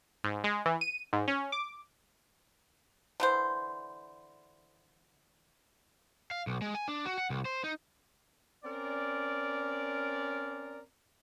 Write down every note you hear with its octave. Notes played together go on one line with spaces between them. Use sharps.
G#2
G#3
E3
D#7
G#2
C#4
D6
D3 E3 C5
F5
B1
G#3
G#5
D4
F#4
F#5
C2
C5
D#4
C4 C#4 A#4 D5